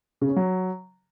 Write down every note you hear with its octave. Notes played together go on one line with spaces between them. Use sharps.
C#3
C#4
F#3